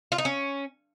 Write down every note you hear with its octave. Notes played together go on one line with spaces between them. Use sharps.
F4
D#4
C#4